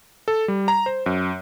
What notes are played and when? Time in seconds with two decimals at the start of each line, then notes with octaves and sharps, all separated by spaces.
0.28 A4
0.48 G3
0.68 A#5
0.86 C5
1.06 F#2